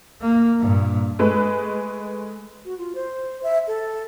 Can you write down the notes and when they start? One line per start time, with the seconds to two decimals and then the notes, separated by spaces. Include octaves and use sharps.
0.21 A#3
0.60 G2 A#2
1.19 G#3 A3 B4
2.65 F#4
2.78 F4
2.95 C5
3.43 E5
3.67 A4